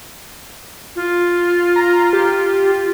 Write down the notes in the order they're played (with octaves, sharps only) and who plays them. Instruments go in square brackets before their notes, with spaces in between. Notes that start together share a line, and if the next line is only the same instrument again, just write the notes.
[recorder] F4
[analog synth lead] A#5
G4